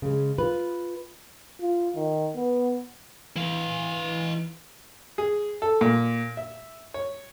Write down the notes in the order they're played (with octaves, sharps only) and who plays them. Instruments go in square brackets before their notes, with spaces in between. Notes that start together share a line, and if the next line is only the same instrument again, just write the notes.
[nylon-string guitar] C#3 G#3
F4 B4
[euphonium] F4
D#3
B3
[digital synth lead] E3 [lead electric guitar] E4 F5
[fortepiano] G#4
A4
A#2
E5
C#5